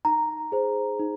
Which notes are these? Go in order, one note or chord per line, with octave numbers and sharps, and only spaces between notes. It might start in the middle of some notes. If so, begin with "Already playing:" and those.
D#4 A#5
G#4 C5
D#4